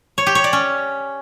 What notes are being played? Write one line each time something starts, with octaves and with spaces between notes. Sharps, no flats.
C#5
G4
C#5
D5
C#4